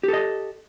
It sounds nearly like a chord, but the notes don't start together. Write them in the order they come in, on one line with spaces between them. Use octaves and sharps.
G4 A4 D#5